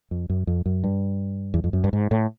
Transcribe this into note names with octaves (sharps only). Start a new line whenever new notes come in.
F2
F#2
F2
F#2
G2
E2
F2
F#2
G2
G#2
A2